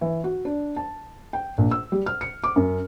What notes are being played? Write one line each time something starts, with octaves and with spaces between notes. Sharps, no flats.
E3
F#4
D4
A5
G5
A#1
E6
G3
F6
C#7
D6
F#2